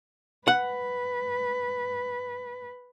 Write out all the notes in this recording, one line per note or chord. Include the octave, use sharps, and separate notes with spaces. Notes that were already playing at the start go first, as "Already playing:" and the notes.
B4 F#5